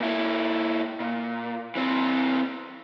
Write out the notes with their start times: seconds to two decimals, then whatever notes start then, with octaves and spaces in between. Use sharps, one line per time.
0.01 A#2 E4
1.00 A#2
1.75 E3 C4